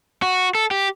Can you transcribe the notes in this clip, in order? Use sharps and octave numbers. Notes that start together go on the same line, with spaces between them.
F#4
A4
G4